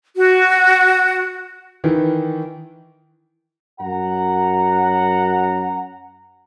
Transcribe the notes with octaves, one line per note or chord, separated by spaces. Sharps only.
F#4
D#3 E3
F#2 F#5 A#5